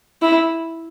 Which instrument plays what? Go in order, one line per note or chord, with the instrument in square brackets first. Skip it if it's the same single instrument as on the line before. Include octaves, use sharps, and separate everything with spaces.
[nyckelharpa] E4